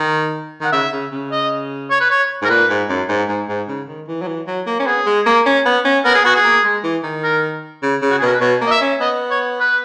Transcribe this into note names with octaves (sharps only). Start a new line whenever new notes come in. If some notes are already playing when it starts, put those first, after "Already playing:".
Already playing: D#3
D#3 F#5
C#3 E5
C#3
C#3
D#5
C#5
B4
C#5
G#2 A#4
A#2 B4
G#2
F#2
G#2
G#2
G#2
C#3
D#3
E3
F#3
E3
F#3
A#3
C#4
B3 G#4
G#3
A#3
C#4
B3
C#4
B3 A#4
G#4
B3 F#4
G#4
A#3
G#3
E3
D#3
A#4
C#3
C#3
F#4
G#4
B2 A#4
B4
B2 C#5
A#3
D#5
E5
C#4
B3 D#5
C#5
B4